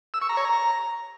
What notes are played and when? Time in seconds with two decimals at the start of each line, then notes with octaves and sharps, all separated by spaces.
0.14 E6
0.22 C#6
0.29 A#5
0.37 C#5
0.45 A#5